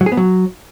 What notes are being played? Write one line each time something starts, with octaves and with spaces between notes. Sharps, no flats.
F#3
G#4
B3
F#3